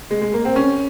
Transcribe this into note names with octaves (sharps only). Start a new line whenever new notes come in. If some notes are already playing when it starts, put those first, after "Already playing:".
G#3
G#3
A#3
C4
C#4